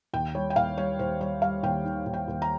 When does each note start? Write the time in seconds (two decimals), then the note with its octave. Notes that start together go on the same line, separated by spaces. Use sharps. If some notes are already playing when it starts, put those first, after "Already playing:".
0.13 D#2 G5
0.35 G3 C#5
0.50 G5
0.56 D#2 F5
0.77 G3 C#5
0.99 D#2 C5
1.20 G3 C#5
1.42 G3 F5
1.63 D#2 G5
1.85 D#3
2.06 D#2
2.14 G5
2.28 D#2
2.42 A#5